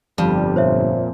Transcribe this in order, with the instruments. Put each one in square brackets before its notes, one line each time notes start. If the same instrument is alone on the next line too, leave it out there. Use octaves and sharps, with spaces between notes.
[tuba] G1 [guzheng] F2 [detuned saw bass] G3
[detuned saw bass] A#2 [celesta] C5 C#5 E5